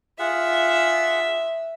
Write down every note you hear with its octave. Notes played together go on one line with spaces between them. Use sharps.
F4 G#4 E5 F#5